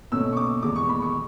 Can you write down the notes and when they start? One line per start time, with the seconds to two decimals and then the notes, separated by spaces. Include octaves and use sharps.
0.12 B2 A3 C#4 E6
0.33 C#6
0.37 D6
0.62 E2 B2 G#3 D6
0.76 C#6
0.89 B5
1.02 C#6